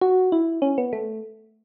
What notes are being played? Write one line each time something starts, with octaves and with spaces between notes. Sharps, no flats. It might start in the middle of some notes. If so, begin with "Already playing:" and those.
F#4
E4
C#4
B3
A3